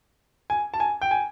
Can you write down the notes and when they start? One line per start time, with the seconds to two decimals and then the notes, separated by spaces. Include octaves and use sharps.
0.50 G#5
0.74 A5
0.80 G#5
1.01 G5
1.11 G#5